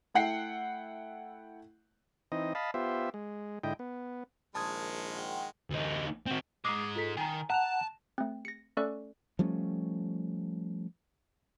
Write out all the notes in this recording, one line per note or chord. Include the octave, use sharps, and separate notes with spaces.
A3 E4 F#5 G5 C7
E3 C4 D#4 D#5
D#5 F5 A5 B5
B3 F4 G4 C5 E5
G#3
G#2 D3 E4 D#5 G5
B3
A#1 D#3 G#3 A5 D#6 G#6
F#5 G5
D2 D#4
C4 F#4
G#2 G#3 D6 D#6 C7
F4 A4 B6
D#3 G#5 A#5
F#5 A5 A#5 F#6 F7
A3 C4
A#6 C#7
A3 C#4 A4 D5 C#6 F#6
F3 G3 A3 C#4